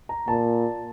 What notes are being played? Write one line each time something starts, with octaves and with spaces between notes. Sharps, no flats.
A#5
A#2 A5